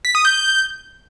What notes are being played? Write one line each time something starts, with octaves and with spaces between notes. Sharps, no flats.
B6
D#6
G6